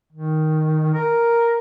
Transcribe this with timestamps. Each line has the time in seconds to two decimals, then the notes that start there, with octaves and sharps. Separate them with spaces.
0.13 D#3
0.94 A#4